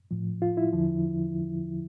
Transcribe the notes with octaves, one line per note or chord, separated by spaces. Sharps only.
A2 F3
F4
E4
E2 D3 F3